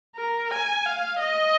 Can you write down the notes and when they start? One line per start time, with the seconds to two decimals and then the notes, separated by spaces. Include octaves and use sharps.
0.16 A#4
0.51 G#5
0.86 F5
1.19 D#5